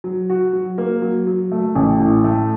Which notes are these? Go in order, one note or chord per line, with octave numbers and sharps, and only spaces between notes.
F#3
F#4
F#3
A#3
F#3
F#3
A3
A1
A2
A3